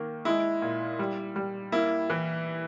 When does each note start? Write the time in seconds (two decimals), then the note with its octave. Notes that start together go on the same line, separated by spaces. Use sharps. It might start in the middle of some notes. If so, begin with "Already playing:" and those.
Already playing: D#3 A#3
0.25 G#3 E4
0.62 A#2
0.99 G3
1.36 G3
1.72 A#3 E4
2.10 E3